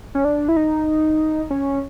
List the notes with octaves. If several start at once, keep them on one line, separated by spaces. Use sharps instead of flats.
C#4
D4
E4
D#4
C#4